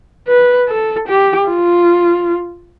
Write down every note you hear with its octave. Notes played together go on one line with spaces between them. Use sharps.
B4
A4
G4
F4